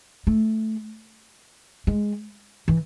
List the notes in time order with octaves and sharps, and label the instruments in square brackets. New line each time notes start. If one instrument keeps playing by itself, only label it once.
[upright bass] A3
G#3
E3